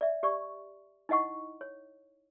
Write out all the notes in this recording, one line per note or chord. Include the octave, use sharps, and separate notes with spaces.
D5 E5
G4 D5 C#6
D#4 E4 D#5 F#5 C#6
C#5